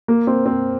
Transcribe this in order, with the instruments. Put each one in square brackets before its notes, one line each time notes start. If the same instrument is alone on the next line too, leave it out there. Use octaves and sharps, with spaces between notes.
[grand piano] A#3
C4
C4